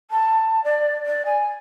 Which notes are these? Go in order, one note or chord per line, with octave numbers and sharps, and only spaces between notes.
A5
D5
D5
G#5